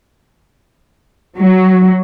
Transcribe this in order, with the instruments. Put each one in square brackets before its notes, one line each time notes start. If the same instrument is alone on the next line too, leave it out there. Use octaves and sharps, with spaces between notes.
[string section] F#3